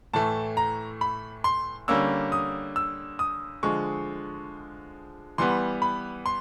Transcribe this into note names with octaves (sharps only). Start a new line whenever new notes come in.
A2 E3 A3 A5
A#5
B5
C6
D3 G3 A#3 C#4 E6
D#6
E6
D#6
D3 F3 G#3 C#6
E3 G3 B3 C6
B5
C6